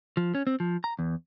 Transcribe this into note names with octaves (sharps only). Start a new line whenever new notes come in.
F3
C#4
C4
F3
A#5
E2